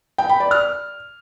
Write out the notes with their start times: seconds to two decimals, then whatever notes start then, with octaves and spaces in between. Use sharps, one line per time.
0.18 G5
0.29 B5
0.40 D5
0.51 F6